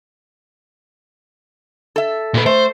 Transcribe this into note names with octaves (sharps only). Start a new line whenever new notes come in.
A4 E5
A#2 B4
A3 C5